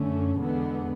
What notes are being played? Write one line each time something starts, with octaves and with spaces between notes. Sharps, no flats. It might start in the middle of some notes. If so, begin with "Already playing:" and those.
Already playing: F#2 D3 A3 C#4
E2 D3 G#3 B3